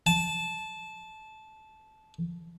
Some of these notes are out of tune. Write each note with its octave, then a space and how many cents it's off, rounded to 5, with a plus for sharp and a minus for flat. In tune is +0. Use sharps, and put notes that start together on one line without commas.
A5 -15